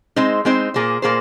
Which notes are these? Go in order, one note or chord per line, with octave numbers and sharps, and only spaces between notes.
G#3 C4 D#4 C5
G#3 C4 D#4 C5
A#2 A#3 G#4 C5
A#2 A#3 G#4 C5